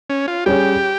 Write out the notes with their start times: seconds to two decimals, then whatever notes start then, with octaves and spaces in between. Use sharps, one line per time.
0.10 C#4
0.28 F4
0.46 G3 C#4 G4 G#4 C#5